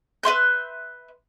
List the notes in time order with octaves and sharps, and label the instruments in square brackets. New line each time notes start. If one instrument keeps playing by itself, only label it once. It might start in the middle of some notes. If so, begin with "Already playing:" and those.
[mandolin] B4 E5 C6 G6